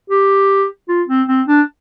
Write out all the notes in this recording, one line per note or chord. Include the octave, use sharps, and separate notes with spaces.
G4
F4
C4
C4
D4